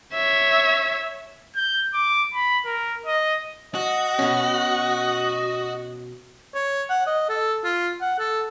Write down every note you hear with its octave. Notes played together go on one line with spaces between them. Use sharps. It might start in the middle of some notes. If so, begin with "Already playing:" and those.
C#5 E5
G6
D6
B5
A#4
D#5
F#4 D#5
B2 C#4
C#5
F#5
D#5
A4
F4
F#5
A4